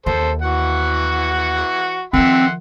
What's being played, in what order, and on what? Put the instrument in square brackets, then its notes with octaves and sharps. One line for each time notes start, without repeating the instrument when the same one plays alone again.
[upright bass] D#2 [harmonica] A4 C5
[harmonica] E3 F#4 F#5
[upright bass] D#3 F3 [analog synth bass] C4 [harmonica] E5 F#5 C6